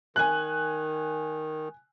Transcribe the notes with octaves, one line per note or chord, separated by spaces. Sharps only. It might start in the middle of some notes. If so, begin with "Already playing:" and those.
D#3 G#5 F#6